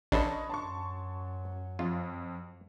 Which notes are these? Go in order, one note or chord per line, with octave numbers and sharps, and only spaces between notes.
A1 D4 A4 C#5 D#5 B5
F#2 F#3 A5 C6 C#6
F2 F4